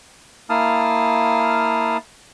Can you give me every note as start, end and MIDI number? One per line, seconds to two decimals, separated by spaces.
0.50 1.97 58
0.50 1.97 64
0.50 1.97 77
0.50 1.97 81
0.50 1.97 87
0.50 1.97 89